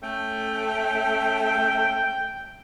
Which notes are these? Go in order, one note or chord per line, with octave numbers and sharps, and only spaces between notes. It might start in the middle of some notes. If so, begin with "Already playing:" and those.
A3 C#4 G5